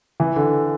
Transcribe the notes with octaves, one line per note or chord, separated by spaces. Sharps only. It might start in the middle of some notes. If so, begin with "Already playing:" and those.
E3
D3